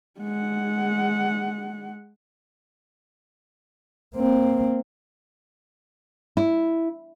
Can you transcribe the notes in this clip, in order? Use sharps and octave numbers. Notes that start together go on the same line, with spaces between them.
G#3 F#5
A#3 C4
E4